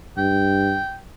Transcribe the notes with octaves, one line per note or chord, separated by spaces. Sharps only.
G2 G5